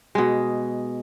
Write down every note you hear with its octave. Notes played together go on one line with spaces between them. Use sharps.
B2 G#3